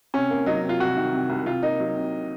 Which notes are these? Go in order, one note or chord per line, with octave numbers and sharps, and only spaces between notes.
C3 C#4
A#3
F#3 D#4
C3
F4
C2 F#4
D#3
C3
C2
C3 F4
A#3 D#4
F#3
C3